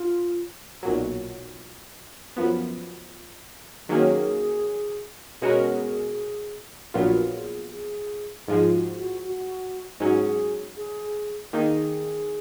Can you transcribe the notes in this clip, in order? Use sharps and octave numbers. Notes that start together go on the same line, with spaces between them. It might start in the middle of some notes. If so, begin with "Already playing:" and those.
Already playing: F4
B1 A#2 F#3
F#2 F3 B3
D#3 F#3 A#3 C#4 G#4
B2 G#3 C#4 F#4 G#4 A#4
A#1 A#2 F#3 B3 F4 A#4
G#4
G#4
G#2 F3 G#3 G#4
F#4
F#4
F#4
G#2 F#3 C#4 G#4
G#4
D#3 A#3 D#4 G#4